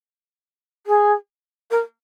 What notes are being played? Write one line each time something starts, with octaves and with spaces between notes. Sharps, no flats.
G#4
A#4